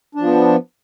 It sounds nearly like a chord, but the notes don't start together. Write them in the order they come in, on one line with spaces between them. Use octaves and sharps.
D4 F3 B3